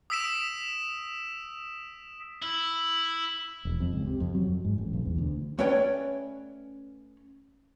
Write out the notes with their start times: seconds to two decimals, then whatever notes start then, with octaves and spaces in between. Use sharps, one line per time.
0.10 D#6 E6 B6 D7 E7
2.42 E4
3.65 E1
3.80 F2
3.93 C#2
4.06 C3
4.20 F2
4.34 F#3
4.47 F2
4.65 G#2
4.78 A1
4.93 B1
5.05 E2
5.18 D2
5.59 A3 C#4 B4 C#5 D5 G5